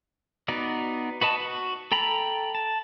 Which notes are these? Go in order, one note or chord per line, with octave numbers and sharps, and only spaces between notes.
B3 D#4 F#4 D5
F#4 B4 D#5 A5
F#4
A4 G5 A#5 B5
A5